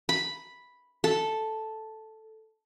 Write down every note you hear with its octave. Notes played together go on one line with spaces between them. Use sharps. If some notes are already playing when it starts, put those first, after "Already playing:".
B5
A4